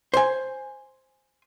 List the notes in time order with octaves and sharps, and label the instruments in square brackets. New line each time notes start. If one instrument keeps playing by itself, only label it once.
[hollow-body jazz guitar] C5 G#5